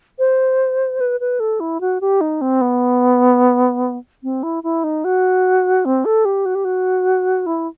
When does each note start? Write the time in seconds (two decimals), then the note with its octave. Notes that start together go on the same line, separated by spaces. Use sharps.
0.19 C5
1.00 B4
1.20 B4
1.40 A4
1.60 E4
1.81 F#4
2.01 G4
2.21 D#4
2.41 C4
2.61 B3
4.23 C4
4.43 E4
4.63 E4
4.84 D#4
5.04 F#4
5.85 C4
6.05 A4
6.25 G4
6.45 F#4
6.55 G4
6.65 F#4
7.46 E4